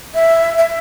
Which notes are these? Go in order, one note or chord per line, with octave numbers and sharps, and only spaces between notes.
E5
E5